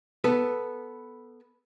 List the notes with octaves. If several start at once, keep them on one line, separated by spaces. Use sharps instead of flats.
B3 A4 B4